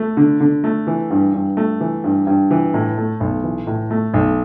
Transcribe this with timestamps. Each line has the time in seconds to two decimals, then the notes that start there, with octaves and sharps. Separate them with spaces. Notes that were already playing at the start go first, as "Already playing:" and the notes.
Already playing: A3
0.17 D3
0.40 D3
0.64 A3
0.87 E3
1.11 G2
1.34 G2
1.57 A3
1.80 E3
2.04 G2
2.27 G2
2.51 E3
2.74 A2
2.98 A3
3.20 B1
3.44 E3
3.67 A2
3.90 A3
4.14 B1